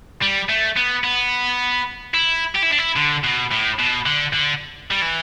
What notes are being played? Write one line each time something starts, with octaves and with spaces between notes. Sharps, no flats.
G3
A3
B3
B3
E4
G4
E4
D4
E4
D3
B2
A2
B2
D3
D3
G3
E3